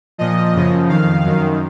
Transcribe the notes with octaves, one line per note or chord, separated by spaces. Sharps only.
A#2 F3 D#5
F#2 C#3 F3
F2 D#3 F5
F#2 D#3